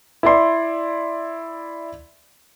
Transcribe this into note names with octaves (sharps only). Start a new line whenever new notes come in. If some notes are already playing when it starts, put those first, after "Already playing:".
E4 D5 C6